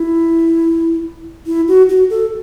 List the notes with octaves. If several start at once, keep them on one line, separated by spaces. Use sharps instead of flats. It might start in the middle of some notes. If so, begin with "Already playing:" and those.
Already playing: E4
E4
F#4
F#4
A4